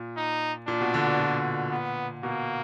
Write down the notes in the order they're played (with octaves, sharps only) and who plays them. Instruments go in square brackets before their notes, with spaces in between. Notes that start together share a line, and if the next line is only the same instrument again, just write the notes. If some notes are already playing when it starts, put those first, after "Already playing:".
Already playing: [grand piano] A#2
[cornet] D#4
[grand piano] A#2 [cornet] D4
[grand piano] B2
D3
B2
A#2
[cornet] B3
[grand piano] B2 [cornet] A#3